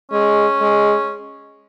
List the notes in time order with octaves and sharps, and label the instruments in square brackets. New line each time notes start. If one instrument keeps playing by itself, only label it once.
[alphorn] G#3 [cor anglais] C#4
[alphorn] G#3